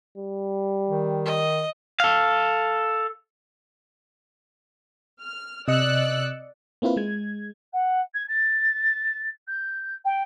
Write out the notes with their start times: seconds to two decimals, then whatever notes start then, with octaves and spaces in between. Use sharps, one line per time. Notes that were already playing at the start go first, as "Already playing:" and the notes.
0.18 G3
0.89 D#3
1.25 D#5
2.00 A4 F5
5.21 F6
5.68 C3 D5 D#5 E6 F#6 C#7
6.82 A#3 C4 E4 F4 B4
6.96 G#3 G#6
7.73 F#5
8.14 G#6
8.28 A6
9.47 G6
10.05 G5